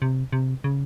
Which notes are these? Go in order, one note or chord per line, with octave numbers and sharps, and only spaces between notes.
C3
C3
C#3